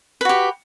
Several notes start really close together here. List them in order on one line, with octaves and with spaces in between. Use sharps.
B4 F#4 G4